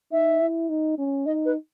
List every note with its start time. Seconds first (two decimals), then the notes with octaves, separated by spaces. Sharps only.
0.12 D#4 E5
0.41 E4
0.69 D#4
0.98 C#4
1.26 D#4 D#5
1.45 B4